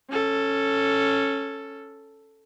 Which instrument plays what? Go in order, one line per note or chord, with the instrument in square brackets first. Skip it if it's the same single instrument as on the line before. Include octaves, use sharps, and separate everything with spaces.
[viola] C#4 A4